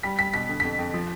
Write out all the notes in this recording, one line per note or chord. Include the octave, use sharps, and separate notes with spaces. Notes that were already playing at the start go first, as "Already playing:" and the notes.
G3 B6
G3 B6
B2 B6
D3
F2 B6
F2
F3